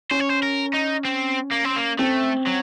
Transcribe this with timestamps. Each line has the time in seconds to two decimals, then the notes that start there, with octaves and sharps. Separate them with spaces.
0.11 C#4 C5
0.20 C#5
0.30 C5
0.43 A#4
0.74 D#4
1.05 C4
1.52 A#3
1.65 C4
1.76 A#3
1.99 A3 C4
2.46 F#3